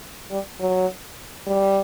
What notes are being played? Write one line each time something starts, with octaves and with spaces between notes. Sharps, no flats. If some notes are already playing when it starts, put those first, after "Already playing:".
G3
F#3
G3